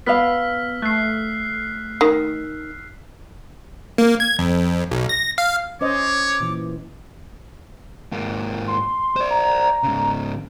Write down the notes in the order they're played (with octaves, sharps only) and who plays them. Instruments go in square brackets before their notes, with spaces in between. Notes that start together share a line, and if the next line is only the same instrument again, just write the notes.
[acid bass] B3 [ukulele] B4 F5 [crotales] E6 F6 B6
[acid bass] A3 [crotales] F#6 C7
[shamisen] D#3
[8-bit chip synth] A#3
G#6
F2
B1
A#6
F5
[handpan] C#4 C5 D#5 [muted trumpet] C#5 [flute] D6
[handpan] A#2 E3
[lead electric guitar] G#2 A#3
[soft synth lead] C6
[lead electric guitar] C5 D5
[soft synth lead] A#5
[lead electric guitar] G#2 C#3